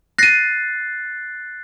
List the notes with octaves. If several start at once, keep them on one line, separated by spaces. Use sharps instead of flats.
F#6 A6 A#6 C7 D#7